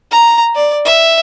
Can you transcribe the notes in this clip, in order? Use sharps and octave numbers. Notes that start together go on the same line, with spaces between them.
A#5
D5
E5